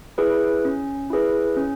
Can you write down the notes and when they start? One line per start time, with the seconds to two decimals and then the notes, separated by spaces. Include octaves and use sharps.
0.18 E4 G#4 B4
0.65 C#4
1.10 E4 G#4 B4
1.56 C#4